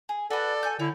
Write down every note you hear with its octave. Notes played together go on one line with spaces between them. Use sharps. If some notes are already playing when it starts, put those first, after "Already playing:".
G#4
F#4 A4 B4 D5
G#5 C#6 G6
D3 E4 C#5